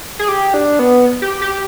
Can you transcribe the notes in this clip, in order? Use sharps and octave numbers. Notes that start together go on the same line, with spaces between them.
G#4
G4
D4
B3
G4
G4